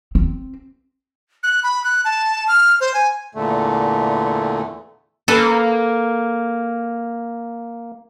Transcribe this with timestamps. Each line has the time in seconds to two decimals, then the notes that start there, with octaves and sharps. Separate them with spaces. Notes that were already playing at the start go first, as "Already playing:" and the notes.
0.15 C4
1.43 F#6
1.63 B5
1.84 F#6
2.05 A5
2.48 F6
2.81 C5
2.94 G#5
3.35 E2 A#2 D3 A3
5.28 A#3 A4 B4